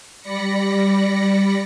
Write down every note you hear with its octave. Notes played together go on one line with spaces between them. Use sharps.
G3 D5 B5 A#6 C#7